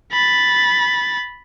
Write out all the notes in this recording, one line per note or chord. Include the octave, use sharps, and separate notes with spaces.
B5 A6